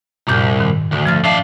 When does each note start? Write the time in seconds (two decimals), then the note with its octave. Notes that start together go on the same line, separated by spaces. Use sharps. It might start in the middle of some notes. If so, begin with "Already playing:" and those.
0.28 C2 F#2 A#2 G6
0.60 G#2 D#3
0.92 D2
1.05 F3 F6 A6
1.25 D4 E5 F5 A5